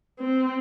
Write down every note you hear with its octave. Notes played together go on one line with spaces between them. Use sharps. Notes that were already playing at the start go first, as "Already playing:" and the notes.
C4